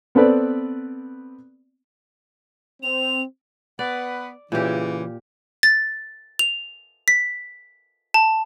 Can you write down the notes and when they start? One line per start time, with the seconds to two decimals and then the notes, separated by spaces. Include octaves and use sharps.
0.15 B3 C4 A4 B4 D5
2.83 C4 F7
3.79 B3 B4 D5 F#5
4.52 A#2 C#3 E3 G4
5.63 A6
6.39 F7
7.08 B6
8.14 A5